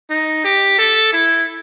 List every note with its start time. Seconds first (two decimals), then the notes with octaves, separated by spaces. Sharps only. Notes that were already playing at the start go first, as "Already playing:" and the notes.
0.10 D#4
0.44 G4
0.79 A4
1.13 E4